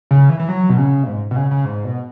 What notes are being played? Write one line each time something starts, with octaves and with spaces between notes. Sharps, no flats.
C#3
E3
E3
F#3
B2
C#3
B2
G#2
B2
C#3
C#3
G#2
B2